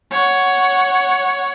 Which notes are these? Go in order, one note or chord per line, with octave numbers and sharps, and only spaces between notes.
C#5 F#5